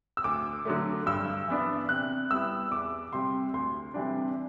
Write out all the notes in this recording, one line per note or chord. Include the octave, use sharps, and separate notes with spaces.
E6
D2 D6
D3 F#3 A3
G2 E6
E3 B3 D4
C3 F#6
G3 B3 E4 E6
E2 D6
C3 G3 C6
D2 C6
C3 E3 G3 D4